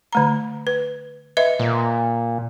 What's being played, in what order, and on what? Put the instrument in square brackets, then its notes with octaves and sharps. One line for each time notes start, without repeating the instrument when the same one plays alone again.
[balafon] D3 A3 A#5
B4
B4 D#5 E5
[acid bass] A#2